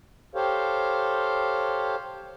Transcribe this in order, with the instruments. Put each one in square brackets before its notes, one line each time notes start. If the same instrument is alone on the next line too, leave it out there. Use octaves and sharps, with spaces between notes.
[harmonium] G4 A4 C5 C#5 F5